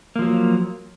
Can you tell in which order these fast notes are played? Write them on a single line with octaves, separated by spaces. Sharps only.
A#3 F3 F#3